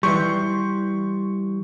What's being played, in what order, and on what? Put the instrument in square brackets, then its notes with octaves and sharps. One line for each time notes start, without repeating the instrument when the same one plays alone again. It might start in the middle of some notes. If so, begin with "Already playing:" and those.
[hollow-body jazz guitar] E3 G3 [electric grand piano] C6 C#6 G6